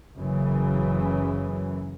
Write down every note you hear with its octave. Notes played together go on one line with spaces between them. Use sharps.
F#1 F#2 C#3 E3